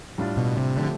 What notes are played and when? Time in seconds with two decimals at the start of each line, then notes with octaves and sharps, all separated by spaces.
0.18 A2 G3 D4 F4
0.37 B2
0.57 C3
0.76 D3 F3 A3 C4 G4